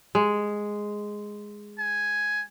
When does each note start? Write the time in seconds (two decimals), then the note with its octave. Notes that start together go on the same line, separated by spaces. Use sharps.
0.15 G#3
1.79 G#5